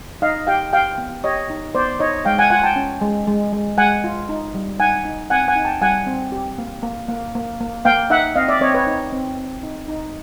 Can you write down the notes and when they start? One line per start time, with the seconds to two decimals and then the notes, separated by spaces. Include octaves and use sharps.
0.22 D#4 D#5 F5
0.47 G4 F5 G5
0.73 G4 F5 G5
0.98 B3
1.24 G4 C#5 D#5
1.50 D#4
1.75 B3 C5 D5
2.00 D#4 C#5 D#5
2.25 G#3 F5 G5
2.38 F#5 G#5
2.50 F4 F#5 G#5
2.63 G5 A5
2.76 C#4
3.01 G#3
3.27 G#3
3.52 G#3
3.78 G#3 F#5 G#5
4.04 F4
4.29 D#4
4.55 G3
4.80 D#4 F#5 G#5
5.05 D#4
5.30 C4 F#5 G#5
5.48 F#5 G#5
5.56 D#4
5.65 G5 A5
5.81 G3 F#5 G#5
6.07 C4
6.32 G4
6.58 A#3
6.83 A#3
7.08 A#3
7.35 A#3
7.60 A#3
7.85 A#3 F5 G5
8.10 D#4 E5 F#5
8.36 C4 D#5 F5
8.48 D5 E5
8.61 C4 C#5 D#5
8.74 B4 C#5
8.87 D#4
9.12 C4
9.38 C4
9.63 D#4
9.88 D#4